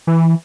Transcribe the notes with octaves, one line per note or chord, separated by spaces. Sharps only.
E3